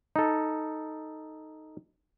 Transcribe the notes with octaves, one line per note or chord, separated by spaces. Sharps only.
D#4 A4